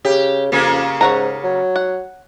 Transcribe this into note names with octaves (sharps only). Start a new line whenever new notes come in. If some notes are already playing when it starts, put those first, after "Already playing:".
C#3 G4
F2 C#3 A#3 C#4
G#2 C#5 F#5 A#5
F#3
F#5